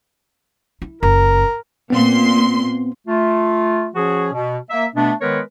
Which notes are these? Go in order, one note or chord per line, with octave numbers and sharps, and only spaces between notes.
E4
F#1 A#4
A#2 B3 C4 C6
A3 F4
F3 C#4 F#4 G#4
B2
A#3 E5
B2 A3 B3 D4
D#3 G#3 B3 A#4 B4 C#5